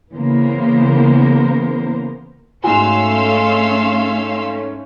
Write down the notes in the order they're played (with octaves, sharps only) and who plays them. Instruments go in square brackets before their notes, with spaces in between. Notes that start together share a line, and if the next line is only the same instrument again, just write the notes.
[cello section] C#3 E3 A#3 B3 A#4 C5
[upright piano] G#2 F#4 [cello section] A3 C#4 [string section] F5 C6 E6 [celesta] G#5